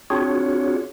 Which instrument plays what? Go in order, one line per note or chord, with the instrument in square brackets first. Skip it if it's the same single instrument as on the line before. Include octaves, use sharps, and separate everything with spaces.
[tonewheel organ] C4 D4 F4 F#4 G#4 C#5